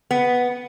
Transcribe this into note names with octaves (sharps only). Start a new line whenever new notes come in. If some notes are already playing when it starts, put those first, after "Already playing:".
B3